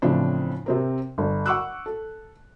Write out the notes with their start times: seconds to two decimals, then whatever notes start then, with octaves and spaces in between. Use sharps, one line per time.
0.02 A2 C#3 E3 F3 C4 D4
0.66 C3 C4 A#4
1.18 G1
1.46 F#5 C#6 D6 E6 F#6
1.86 A4